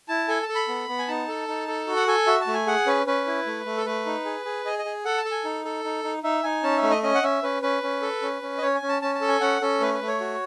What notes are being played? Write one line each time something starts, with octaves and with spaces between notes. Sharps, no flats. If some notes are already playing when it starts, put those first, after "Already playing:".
E4 A5
A4 G#5
A5
A4
B5
B3
B3
G#5
D#4 A5
A4
D#4
A4
F#4
F#5
A4 G#5
F#4 E5
A5
A3
G#5
G#4 F#5
C#4 B4
C#4 B4
E4
A3
A3
A4
A3 B4
D#4
G#4
G#4
G#4 D#5
D#5
G#4
A4 F#5
A5
A4
G#5
D#4
A4
D#4
D#4
D#4 E5
D#4 G#5
C#4 A5
E5
A3
D#5
C#4 D#5
F#5
C#4 E5
C#4 B4
C#4 B4
C#4
A4
C#4
C#4
D#5
C#4 C#5
G#5
C#4
A5
C#4 A5
A5
A4
G#5
C#4 F#5
C#4 A4
A3 B4
B4
A3
C#5
F#4